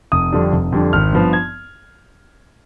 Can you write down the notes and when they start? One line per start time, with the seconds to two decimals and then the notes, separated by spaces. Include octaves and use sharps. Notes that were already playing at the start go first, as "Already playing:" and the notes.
0.12 F1 D#6
0.32 F2 D3 G3 D4
0.52 F1
0.72 F2 D3 G3 D4
0.93 G#1 F6
1.13 G2 F3 B3
1.33 G#6